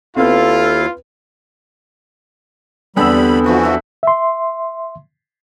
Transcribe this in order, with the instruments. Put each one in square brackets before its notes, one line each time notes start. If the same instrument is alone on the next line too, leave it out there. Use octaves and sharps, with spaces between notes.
[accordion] D#2 E4 F5 [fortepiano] B3 C4 [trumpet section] F4 [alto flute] A4
[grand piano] E2 E6 [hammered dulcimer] D3 B3 C4 [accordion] G3 B5
[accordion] E3 F3 F#4 [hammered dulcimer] B3 B4 C#6
[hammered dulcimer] A4 E5
[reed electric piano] E5 C6